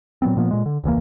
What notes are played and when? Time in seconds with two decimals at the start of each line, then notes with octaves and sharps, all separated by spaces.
0.22 A#2 F#3 B3 C4
0.37 A#2 F3 A#3 B3
0.51 A#2 G#3
0.66 D3
0.84 E1 C#2 E3 A#3